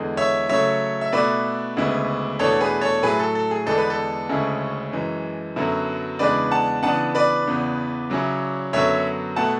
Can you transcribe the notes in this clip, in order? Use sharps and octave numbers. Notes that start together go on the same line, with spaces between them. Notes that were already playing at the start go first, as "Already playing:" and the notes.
Already playing: E2 D3 G#3
C#5 E5
C#3 F#3 A3 C#5 E5
E5
B2 A3 E4 B4 D5
D2 C#3 G#3 B3 E4
E2 B2 A3 D4 A4 C#5
G#4 B4
A4 C#5
A2 F#3 A3 E4 G#4 B4
A4
A4
G#4
E2 D3 G#3 B3 D4 A4
B4
A4
D2 C#3 G#3 C#4 E4
F#2 E3 G#3
F#2 D3 F#3 B3 E4
E2 C#3 G#3 B3 D4 B4 D5
F#5 A5
C#3 E3 B3 D4 F#5 A5
B4 D5
E2 C#3 E3 B3
C#3 F#3 C#4 E4
F#2 D3 F#3 B3 C#5 E5
B2 A3 E4 F#5 A5